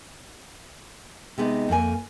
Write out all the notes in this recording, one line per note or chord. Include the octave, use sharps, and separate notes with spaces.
C3 G#3 B3 D#4
F2 A3 A#3 G#5